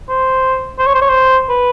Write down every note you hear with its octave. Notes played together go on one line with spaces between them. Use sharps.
C5
C5
C#5
C5
C#5
C5
B4